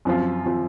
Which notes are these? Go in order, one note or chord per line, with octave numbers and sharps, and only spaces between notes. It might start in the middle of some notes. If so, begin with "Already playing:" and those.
F#2 F3 C4 F4
F3 C4 F4